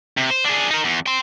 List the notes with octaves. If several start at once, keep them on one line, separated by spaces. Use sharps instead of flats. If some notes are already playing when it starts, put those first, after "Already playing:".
C3
C5
D4 G#4
D#4 A#4
E2
G5 C6